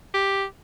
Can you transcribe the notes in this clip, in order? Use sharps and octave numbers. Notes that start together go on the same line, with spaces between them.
G4